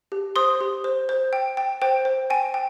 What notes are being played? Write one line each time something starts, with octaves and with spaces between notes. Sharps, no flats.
G4
C5 C6 D#6
G4
C5
C5
G5
G5
C5 G5
C5
G5 G#5
G5